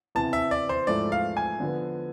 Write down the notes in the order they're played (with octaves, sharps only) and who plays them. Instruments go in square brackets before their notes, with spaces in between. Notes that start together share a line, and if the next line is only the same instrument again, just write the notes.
[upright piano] E2 C3 E3 [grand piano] A5
[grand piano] E5
D5
C5
[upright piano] G#2 F3 A3 E4 [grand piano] D5
[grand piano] F5
G#5
[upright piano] D3 F3 B3